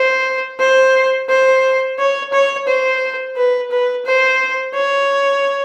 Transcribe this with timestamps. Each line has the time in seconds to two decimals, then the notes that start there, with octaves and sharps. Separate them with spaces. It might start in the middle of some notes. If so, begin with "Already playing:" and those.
Already playing: C5
0.59 C5
1.29 C5
1.98 C#5
2.33 C#5
2.67 C5
3.37 B4
3.71 B4
4.06 C5
4.74 C#5